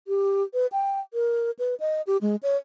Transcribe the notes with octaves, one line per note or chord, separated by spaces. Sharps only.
G4
B4
G5
A#4
B4
D#5
G4
G#3
C#5